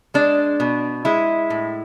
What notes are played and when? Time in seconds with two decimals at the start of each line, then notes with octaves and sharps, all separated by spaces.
0.14 G#3 D4
0.60 B2
1.05 G#3 E4
1.50 A2